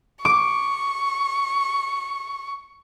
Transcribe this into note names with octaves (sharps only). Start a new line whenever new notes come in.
C#6 D6